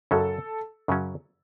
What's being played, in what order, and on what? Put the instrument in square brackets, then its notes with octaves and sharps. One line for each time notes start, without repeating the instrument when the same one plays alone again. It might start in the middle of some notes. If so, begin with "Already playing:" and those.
[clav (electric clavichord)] F#2 C#3 F#3 C#4 [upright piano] A4
[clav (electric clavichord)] F#2 C#3 F#3 C#4